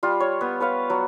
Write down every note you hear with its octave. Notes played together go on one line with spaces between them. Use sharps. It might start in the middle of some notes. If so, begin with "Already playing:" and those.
G3 F4
C#5
B3
B4 C#5 F5
F#3